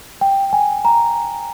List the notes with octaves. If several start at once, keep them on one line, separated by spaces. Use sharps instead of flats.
G5
G#5
A#5